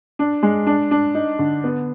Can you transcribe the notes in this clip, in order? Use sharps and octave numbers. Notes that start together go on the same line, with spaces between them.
D4
G#3
D4
D4
D#4
D3
B3